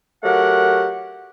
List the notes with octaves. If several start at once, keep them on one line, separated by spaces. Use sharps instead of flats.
F#3 A3 G4 A#4 F#5